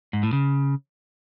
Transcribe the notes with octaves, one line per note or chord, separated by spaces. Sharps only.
G#2
A2
C#3